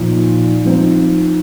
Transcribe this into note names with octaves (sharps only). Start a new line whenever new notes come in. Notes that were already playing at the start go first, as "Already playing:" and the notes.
Already playing: A#2 F3 D#4
F3 C4 D#4